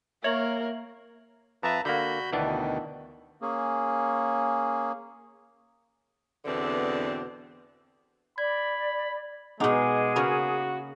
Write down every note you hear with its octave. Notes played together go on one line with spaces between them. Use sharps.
A#3 A#4 C#5 E5 F#7
F2 B4 E5 A5 A#5
D3 A#3 F#4 B5 G6
D2 B2 D#3 E3 B3 D4
A#3 C#4 G#4
E2 B2 D3 B3 C4 D4
D5 B5 G#6
B2 G#3 B3 D#4 G#4 F#5 D6
C#3 A#3 C#4 F#4 B5